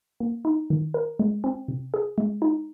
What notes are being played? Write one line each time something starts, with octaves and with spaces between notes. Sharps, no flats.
A#3
D#4
D#3
A#4
G#3
C4
C3
G#4
G#3
D#4